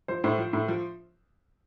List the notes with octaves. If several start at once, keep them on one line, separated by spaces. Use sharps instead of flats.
F3 C5
A2 C5
F3
A2
F3